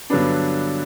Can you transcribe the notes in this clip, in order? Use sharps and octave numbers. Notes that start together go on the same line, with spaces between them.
G2 D3 F#3 B3 D4